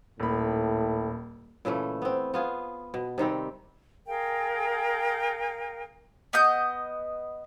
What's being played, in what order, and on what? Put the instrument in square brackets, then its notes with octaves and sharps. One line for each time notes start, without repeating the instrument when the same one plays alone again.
[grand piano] D#1 B5 [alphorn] A2
[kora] A#2 C#3 E3 A3
B3 C4
B3 F4 G#4
B2
C3 D#3 G3 C4
[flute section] G#4 A#4 F5 G5
[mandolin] B3 D#5 G6